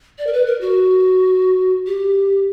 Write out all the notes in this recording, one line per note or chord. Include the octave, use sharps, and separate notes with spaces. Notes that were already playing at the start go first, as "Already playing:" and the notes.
D5
A#4
B4
A#4
F#4
G4